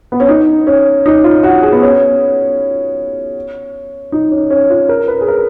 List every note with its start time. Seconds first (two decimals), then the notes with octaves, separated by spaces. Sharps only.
0.12 B3
0.20 C#4
0.29 D#4
0.67 C#4
1.06 D#4
1.24 F4
1.43 F#4
1.62 G#4
1.72 B3
1.82 C#4
4.12 D#4
4.31 C#4
4.50 C#4
4.70 F4
4.89 A#4
5.08 B4
5.21 G#4
5.28 A#4